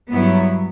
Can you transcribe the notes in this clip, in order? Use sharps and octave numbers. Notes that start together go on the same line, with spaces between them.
G2 F#3 B3 E4